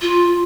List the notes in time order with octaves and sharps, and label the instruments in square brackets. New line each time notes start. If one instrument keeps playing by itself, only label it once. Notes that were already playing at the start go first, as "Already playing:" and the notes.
[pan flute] F4